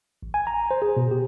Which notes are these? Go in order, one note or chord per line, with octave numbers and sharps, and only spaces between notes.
A1
G#5
A#5
C5
G#4
B2
G4